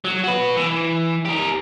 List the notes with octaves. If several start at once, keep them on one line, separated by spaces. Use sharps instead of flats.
F#3
F#4 B4
E3
G4 A#4